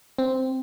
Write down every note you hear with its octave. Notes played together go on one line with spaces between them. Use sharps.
C4